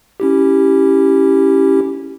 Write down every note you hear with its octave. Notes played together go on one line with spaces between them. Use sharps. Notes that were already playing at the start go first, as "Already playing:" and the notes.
C#4 E4 G4